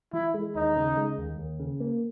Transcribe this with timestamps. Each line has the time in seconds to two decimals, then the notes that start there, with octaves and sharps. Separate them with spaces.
0.13 E3 E4
0.34 G#3
0.55 D#2 D#4
0.76 C#3
0.97 G#3
1.18 D#2
1.38 D#2
1.60 C#3
1.80 A#3